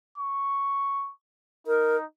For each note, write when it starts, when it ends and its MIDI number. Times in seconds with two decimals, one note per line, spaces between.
0.18 1.11 85
1.67 2.05 63
1.67 1.97 70